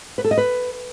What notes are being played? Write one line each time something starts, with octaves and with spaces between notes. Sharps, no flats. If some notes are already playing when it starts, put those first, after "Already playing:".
B4
A4
D#5
B4